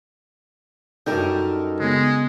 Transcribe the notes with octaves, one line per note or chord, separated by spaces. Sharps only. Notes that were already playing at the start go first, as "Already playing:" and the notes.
F#2 G3 D#4 A4 A#4 G6
C#3 G#3 B3